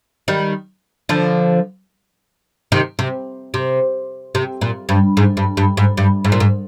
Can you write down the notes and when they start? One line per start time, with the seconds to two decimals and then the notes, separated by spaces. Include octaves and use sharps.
0.28 D#3 G3
1.09 D3 F3
2.72 C3 D#3
2.99 C3
3.54 C3
4.35 C3
4.61 A#2
4.89 G2
5.17 G#2
5.37 G2
5.57 G2
5.77 G#2
5.97 G2
6.25 G#2
6.32 A#2
6.40 G#2